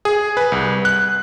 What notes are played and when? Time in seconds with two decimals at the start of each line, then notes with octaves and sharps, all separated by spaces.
0.05 G#4
0.37 B4
0.52 C2
0.85 F#6